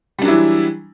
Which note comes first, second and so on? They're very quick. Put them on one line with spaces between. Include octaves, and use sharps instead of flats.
G3 D4 F#3 E4 E3